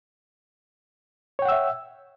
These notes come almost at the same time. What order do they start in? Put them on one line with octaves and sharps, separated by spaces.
C#5 G5 F#5 E6 E5